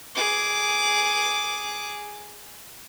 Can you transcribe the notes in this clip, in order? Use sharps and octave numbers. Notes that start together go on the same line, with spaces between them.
G#4 D6